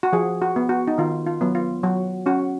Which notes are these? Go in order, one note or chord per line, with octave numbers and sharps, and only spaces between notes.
F#4
F3 G#4
F#4
B3
F#4
D#4
D#3 F4
F4
F#3 B3
F4
F#3 F#4
C#4 F#4